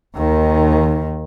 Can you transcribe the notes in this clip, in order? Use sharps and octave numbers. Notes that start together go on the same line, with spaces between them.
D#2 D#3